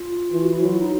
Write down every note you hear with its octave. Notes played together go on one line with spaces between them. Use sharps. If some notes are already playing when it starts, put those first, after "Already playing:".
Already playing: F4
E3 F4
F#4
E4
F#3 F4
E4
D#4